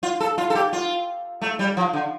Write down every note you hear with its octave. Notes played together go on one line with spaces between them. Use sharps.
F4
A4
F4
A4
G4
F4
A3
G3
F3
D3